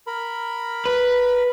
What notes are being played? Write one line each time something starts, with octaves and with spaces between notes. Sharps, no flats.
A#4 B5
B4